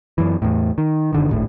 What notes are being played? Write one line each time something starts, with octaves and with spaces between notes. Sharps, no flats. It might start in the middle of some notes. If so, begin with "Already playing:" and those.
F#2 E3
E2 A2
D#3
F#1 D3 D#3
D1 G#1 A2